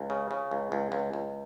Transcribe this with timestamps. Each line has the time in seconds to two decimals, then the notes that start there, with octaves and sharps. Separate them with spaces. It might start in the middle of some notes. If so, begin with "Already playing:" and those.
Already playing: C#2
0.10 C#3
0.31 C#3
0.51 C#2
0.72 C#2
0.92 C#2
1.13 C#2